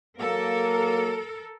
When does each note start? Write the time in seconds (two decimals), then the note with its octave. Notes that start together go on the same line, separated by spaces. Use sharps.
0.19 F#3 A#3 A4 A#4